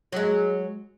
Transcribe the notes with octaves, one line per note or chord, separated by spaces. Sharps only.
F#3 G#3